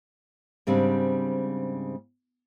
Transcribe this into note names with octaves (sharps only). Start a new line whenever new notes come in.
G#2 C#3 G3 C4 D4